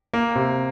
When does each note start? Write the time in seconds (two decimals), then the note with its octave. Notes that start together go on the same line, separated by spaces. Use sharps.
0.13 A#3
0.35 C3